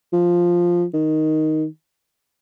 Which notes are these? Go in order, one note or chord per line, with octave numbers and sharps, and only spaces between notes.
F3
D#3